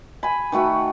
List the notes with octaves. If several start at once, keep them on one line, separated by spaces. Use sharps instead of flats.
G#5 B5
D#3 A3 F#4 B5